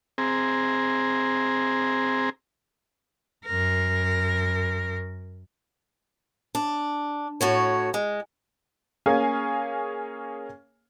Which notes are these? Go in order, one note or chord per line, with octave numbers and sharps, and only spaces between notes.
C4 G#4 A#5
F#2 A#4
D4
A2 F#4 C#5
G#3
A#3 C#4 G#4 F5 G#5